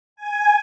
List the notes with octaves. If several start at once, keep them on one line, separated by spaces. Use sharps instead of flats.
G#5